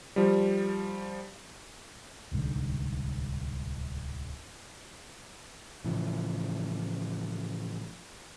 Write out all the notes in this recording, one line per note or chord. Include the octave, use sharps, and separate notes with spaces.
F3 G3
D1 C2 G#2 D3
A2 C#3 E3 F3